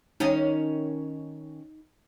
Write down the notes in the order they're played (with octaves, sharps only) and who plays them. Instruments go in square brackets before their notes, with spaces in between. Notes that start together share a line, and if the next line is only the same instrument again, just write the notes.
[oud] D#3 C#4 D#5 [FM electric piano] D#4